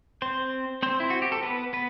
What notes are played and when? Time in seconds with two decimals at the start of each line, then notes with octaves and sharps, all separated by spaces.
0.22 C4 C5
0.83 C4 C5
1.00 E4
1.10 F#4
1.22 G4
1.32 A4
1.43 B3 B4
1.73 B3 B4